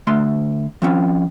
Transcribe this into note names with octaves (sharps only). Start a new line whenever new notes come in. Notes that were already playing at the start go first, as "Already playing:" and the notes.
D2 A3 C6
F3 C4 C#4